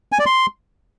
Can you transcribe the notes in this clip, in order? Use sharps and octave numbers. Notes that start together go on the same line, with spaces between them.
G#5
D5
C6